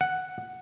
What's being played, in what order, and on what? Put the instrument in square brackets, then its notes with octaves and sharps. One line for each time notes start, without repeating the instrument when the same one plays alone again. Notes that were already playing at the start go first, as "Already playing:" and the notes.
[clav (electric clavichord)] F#5